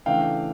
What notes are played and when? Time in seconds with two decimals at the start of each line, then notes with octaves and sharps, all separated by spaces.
0.06 C#3 E3 A3 D4 F5 G5